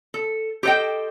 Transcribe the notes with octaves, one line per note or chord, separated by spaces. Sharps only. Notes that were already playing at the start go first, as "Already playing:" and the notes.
A4
G4 A4 C5 D#5 G5